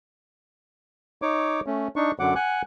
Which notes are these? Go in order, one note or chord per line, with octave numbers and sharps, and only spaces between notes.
D#4 C#5 D6
A3 C#4
D4 D#4 C#6
F#2 D3 F#3 F#5 D6
F#5 G#5 F#6